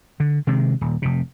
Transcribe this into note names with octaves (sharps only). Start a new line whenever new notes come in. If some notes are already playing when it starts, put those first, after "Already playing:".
D3
C3 D#3 G#3
D#1
F1 C3